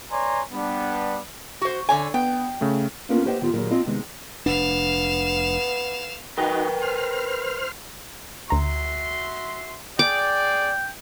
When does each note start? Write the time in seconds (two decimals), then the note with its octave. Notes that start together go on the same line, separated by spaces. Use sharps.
0.11 B4 C#5 D5 G#5 A#5 C6
0.52 G3 B3 D4
1.61 F#4 C5
1.89 D3 C#5 G#5
2.14 B3 G5
2.61 C#3 A3
3.09 A#3 B3 C#4 D4 F4 A#4
3.25 G4 B4 C5 D#5 F#5 G5
3.42 D#3 B3 F4 G4
3.54 D#2 A#2 D3 F#3 G#4 A#4
3.70 C4 F4 D#5 F5 A5
3.86 C3 D#3 G#3 B3
4.46 F1 B3 D4 F5 E7
6.38 D#4 F#4 A#4 B4 G5
6.82 C5 F6
8.50 D2 F#4 E5 A#5 C6
9.99 G#4 D5 G5 D6